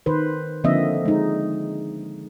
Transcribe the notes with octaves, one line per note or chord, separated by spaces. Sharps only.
D#3 B4 C5
D3 F3 A#3 C4 D#5 E5
G#3 D#4